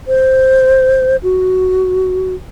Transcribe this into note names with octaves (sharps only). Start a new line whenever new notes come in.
C5
F#4